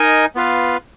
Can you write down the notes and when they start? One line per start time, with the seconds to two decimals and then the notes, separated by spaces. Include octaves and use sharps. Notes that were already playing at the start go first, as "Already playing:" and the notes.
Already playing: D#4 A#4 D#5 G#5
0.35 B3 F4 B4 F5